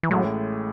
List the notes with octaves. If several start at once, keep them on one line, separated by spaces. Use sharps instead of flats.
E3
A1 A2 F#3 G#3